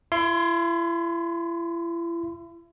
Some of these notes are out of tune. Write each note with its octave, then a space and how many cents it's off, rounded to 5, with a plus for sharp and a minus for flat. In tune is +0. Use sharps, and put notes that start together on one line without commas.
E4 +40 C6 +0